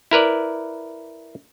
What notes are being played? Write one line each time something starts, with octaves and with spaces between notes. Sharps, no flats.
E4 A#4 B4 D5